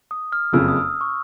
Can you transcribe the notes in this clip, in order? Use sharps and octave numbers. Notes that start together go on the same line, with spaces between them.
D#6
F6
F#1 F2 C#3 E6
D#6
C#6